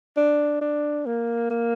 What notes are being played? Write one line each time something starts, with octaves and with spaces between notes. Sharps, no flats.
D4
D4
A#3
A#3